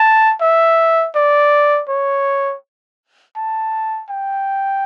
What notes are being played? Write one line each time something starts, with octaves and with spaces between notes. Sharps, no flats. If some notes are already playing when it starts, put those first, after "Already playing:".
Already playing: A5
E5
D5
C#5
A5
G5